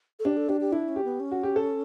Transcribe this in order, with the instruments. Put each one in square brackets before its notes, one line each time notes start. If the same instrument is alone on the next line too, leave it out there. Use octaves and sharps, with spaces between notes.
[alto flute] A4
[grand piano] D4 [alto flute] G4
[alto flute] A4
[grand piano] D4 [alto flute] G4
[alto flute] G4
[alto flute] D4 [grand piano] E4
[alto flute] C#4
[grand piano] G4
[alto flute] B3
C#4
[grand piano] F#4
G4
A4